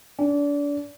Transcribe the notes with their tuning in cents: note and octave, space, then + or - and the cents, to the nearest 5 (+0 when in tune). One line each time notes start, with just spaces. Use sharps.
D4 -30